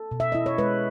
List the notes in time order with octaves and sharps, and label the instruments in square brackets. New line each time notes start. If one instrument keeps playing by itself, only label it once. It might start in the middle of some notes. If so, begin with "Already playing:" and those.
Already playing: [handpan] A4
B2
E5
E4 D#5
C#5
G#3 B4